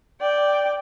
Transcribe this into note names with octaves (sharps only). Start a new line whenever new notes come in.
D5 G5